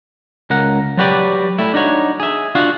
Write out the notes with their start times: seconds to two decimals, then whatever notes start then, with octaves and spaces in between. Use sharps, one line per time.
0.50 C#2 A#4 F#5
0.97 F#3 G3 F#4 G4 B4 D5
1.58 G3 A3 E4
1.74 D4 D#4 F#4 C#5
2.20 G#4 E5
2.55 D4 F4 F#4 F5 F#5